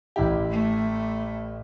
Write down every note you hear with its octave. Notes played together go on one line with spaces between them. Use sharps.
A1 E4 G4
A3